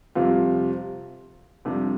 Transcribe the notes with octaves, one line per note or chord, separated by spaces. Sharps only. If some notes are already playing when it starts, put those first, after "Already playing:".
F2 C3 G3 C4 F4
F2 C3 G3 D4